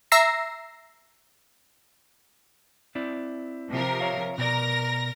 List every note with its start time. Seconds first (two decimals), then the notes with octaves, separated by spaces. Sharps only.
0.12 E5 A#5 E6 A#6 C7
2.95 C4 E4 D5
3.70 C3 F3 A#4
4.00 C#5 E5 F5
4.38 B2 A#4 D5 A#6